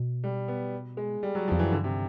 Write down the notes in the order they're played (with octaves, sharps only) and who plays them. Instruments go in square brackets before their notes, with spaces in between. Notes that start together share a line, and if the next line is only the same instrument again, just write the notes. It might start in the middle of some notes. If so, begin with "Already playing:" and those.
Already playing: [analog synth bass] B2
[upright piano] G3
B3
G#3
G3
F#3
F3
[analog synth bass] F2
[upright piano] E3
[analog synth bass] F#2
[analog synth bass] G2 [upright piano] D3
[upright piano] C3